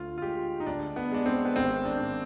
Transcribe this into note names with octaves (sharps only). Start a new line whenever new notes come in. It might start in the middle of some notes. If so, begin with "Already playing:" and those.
Already playing: D2 F4
F4
G#3 G4
D#4
D2 D4
B3
G#3 D4
C4
B3
G#1 C4
D4
G#1